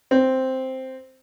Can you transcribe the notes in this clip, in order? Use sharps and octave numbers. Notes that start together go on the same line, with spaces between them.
C4